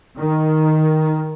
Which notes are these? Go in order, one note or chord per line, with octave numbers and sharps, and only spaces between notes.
D#3